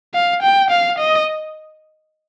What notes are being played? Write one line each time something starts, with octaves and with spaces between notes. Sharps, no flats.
F5
G5
F5
D#5